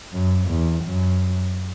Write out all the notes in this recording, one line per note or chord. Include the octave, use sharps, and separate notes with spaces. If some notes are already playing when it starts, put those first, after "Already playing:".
F#2
E2
F#2